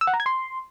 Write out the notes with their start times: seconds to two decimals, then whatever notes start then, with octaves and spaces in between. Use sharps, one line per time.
0.01 E6
0.07 F#5
0.14 A#5
0.20 G#6
0.26 C6